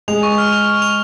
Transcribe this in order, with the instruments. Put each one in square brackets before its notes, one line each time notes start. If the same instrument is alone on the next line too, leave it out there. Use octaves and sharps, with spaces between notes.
[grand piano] G#3 [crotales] F7
[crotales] C#6
F6
F7
F6
F7